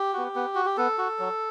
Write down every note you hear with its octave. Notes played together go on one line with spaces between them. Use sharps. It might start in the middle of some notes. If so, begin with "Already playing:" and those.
Already playing: G4
B3 F#4
B3
F#4
G4
B3 A4
F#4
F#3